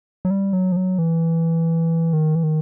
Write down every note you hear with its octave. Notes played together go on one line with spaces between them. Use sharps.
F#3
G3
F#3
F3
F#3
E3
D#3
E3
D#3